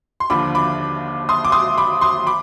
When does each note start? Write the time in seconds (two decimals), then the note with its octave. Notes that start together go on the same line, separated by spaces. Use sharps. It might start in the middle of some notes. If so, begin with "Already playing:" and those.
0.20 C6
0.30 D#2 D3 F3 B5 D6
0.55 B5 D6
1.29 C6 D#6
1.45 D6
1.52 C6 D#6
1.77 B5 D6
2.01 C6 D#6
2.26 B5 D6